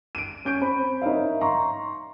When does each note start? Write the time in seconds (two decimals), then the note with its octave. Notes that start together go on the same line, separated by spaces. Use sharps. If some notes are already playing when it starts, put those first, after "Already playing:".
0.15 D7 D#7
0.45 C#4 G6 D7
0.61 C4 B5
1.02 D#4 A#4 C#5 E5 F5
1.41 A#5 C6 C#6